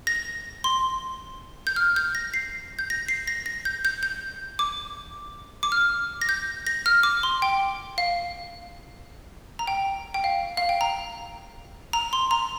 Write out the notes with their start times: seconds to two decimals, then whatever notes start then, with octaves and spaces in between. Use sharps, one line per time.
0.07 A#6
0.64 C6
1.67 G6
1.76 F6
1.96 G6
2.15 A#6
2.34 C7
2.79 G6
2.90 A#6
3.08 C7
3.27 A#6
3.46 A#6
3.65 G6
3.85 G6
4.03 G6
4.59 D6
5.63 D6
5.72 F6
6.21 A#6
6.29 G6
6.67 A#6
6.86 F6
7.03 D6
7.23 C6
7.42 G5
7.98 F5
9.59 A#5
9.67 G5
10.14 G5
10.24 F5
10.57 F5
10.69 G5
10.81 A#5
11.93 A#5
12.13 C6
12.31 A#5